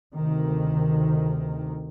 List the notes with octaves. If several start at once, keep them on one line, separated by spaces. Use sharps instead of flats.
D2 C3 D#3